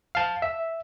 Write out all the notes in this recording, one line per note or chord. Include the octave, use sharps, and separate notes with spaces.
F5 A5
E5